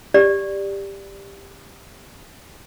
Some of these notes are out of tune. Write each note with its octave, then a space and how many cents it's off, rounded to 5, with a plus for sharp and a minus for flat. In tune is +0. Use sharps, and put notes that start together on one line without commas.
G4 +10 D5 +0